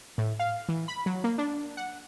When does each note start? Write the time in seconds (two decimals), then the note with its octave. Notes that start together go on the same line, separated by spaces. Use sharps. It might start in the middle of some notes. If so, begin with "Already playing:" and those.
0.18 A2
0.39 F5
0.69 E3
0.88 B5
1.06 F#3
1.24 A#3
1.38 D4
1.77 F#5